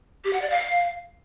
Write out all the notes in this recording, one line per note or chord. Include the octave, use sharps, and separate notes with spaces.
G4
F#5
D5
F5